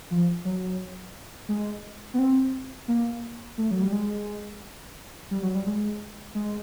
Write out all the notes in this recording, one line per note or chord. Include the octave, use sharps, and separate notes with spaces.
F3
F#3
G#3
B3
C4
A#3
A3
F#3
G3
G#3
G3
F#3
G3
G#3
G#3